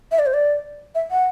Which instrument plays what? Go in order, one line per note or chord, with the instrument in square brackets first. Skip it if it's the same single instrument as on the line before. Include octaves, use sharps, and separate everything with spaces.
[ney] E5
D5
C5
D5
E5
F#5